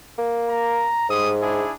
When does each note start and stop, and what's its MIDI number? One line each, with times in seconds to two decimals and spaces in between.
0.18 0.88 58
0.49 1.09 82
1.09 1.64 44
1.09 1.32 55
1.09 1.32 56
1.09 1.32 87
1.41 1.72 62
1.41 1.72 64
1.41 1.72 68